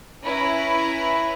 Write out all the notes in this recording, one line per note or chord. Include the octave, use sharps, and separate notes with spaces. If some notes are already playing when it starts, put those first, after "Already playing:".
C#4 E4 B4 A#5